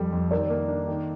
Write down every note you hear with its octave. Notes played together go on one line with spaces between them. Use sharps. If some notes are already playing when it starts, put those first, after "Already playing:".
Already playing: F2 G3 A4
F2
D#3 A#4 D5
A#3
D4
D#3